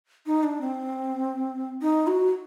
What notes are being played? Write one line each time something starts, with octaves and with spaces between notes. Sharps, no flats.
D#4
D4
C4
D#4
F#4